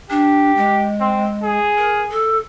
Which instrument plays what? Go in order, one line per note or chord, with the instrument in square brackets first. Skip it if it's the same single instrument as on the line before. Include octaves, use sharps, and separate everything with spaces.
[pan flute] D4 [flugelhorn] G4
[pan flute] G#3
[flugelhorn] C4
G#4
[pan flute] A#4
A4